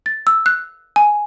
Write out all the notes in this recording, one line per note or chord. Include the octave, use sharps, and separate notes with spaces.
A6
E6
F#6
G#5